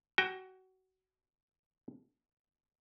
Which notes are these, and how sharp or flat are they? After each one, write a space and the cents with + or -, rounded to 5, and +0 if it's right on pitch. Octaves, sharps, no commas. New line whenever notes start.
F#4 +20 G5 +35